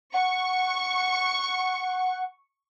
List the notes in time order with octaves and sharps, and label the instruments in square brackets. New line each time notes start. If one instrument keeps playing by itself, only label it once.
[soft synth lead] F#5 [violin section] C#6